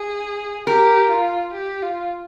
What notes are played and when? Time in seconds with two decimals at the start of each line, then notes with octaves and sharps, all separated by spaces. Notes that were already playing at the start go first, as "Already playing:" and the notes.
Already playing: G#4
0.67 G4 A#4
1.10 F4
1.53 G4
1.82 F4